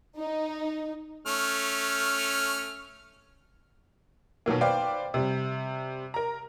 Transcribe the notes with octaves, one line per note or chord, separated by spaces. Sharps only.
D#4
A3 C#4 F6
B2 D#3 F#3 A#3
B4 C5 D5 F5 G5
C3 G3
A#4 A#5